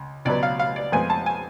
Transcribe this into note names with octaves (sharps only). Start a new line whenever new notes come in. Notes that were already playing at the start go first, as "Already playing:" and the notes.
Already playing: C#2
C#2 B2 F#3 B3 D5
F5
F5
D5
F2 F3 G#3 B3 G#5
A5
G#5